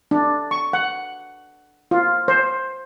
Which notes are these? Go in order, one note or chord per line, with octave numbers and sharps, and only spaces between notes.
D4
C#6
F#5
F4
C5